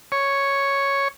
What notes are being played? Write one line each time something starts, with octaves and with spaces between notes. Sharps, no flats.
C#5